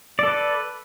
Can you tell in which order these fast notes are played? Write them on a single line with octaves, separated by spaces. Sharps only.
D5 A4 B4